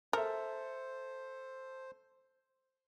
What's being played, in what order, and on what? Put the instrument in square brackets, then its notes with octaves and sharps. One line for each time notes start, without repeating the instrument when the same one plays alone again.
[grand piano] A4 E5 [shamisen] A#4 [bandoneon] C5